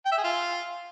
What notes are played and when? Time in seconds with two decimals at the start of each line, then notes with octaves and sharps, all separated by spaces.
0.06 G5
0.12 E5
0.18 G#4
0.24 F4